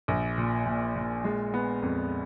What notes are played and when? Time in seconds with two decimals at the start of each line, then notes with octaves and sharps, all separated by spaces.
0.08 A#1
0.38 A#2
0.66 A#2
0.96 A#2
1.24 G#3
1.54 B3
1.82 F2